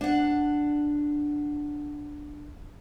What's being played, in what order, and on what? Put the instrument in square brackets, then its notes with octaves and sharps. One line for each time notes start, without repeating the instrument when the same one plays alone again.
[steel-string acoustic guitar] D4 F#5